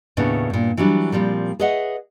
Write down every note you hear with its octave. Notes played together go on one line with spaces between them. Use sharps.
D#2 A2 C#3 B3 D4
G2 A#2
E3 F#3 G3 D4
A#2 F3 G3 C4
G#4 B4 C#5 D#5 E5 F#5